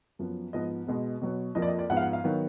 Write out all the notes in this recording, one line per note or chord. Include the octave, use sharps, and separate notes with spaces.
F#2 F3 B3
G#2 F3 B3 D#5
B2 G#3 B3
B2 F#3 B3
F2 F3 A#3 D#5
D5
D#5
D5
G#2 F3 B3 F#5
F5
F#5
F5
D#3 F#3 B3